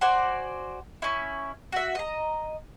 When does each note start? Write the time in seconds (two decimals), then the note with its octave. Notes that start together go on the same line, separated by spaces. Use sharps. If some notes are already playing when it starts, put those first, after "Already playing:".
0.01 F#4 C5 D5 G#5
1.02 C#4 E4
1.72 F#4 E5
1.95 D#5 A#5